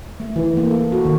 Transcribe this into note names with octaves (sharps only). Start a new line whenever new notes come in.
A3
E3
A#3
A4
F#4
D#3